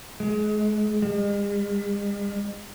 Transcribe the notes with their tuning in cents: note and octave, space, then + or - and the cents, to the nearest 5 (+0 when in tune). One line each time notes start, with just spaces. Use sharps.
G#3 +30
G#3 -45